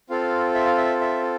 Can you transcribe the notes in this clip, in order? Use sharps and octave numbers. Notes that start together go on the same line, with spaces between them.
C4 F4 A4 F5
E5
F5
E5
E5